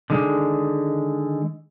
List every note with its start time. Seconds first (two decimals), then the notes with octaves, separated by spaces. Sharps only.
0.10 D3 D#3 G#3